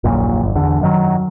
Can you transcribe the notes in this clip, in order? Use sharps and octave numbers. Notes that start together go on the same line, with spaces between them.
D#1 A#1 F#2 A#2
G1
E2 D3
F#2 D#3 F#3